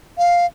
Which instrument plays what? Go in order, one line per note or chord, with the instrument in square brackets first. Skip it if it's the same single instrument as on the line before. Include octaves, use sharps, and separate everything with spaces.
[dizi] F5